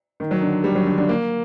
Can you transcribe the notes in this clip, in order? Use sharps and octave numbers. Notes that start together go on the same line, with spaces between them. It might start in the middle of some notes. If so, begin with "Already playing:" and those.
D#3
F#3
D3
G3
F#3
D3
D3
A#3